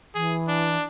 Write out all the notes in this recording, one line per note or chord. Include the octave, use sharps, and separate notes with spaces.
E3 G#4
D4